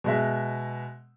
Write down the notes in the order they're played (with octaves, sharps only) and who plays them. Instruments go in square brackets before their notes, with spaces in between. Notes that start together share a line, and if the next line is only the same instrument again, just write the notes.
[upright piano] B2 G#3 E5